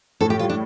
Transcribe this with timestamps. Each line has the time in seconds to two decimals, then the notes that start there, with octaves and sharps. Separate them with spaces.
0.21 A2 A4
0.30 G4
0.39 G3 F4
0.50 D4